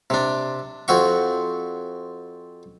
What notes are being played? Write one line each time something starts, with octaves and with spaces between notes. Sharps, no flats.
C3 D4
F2 C4 F#4 C#6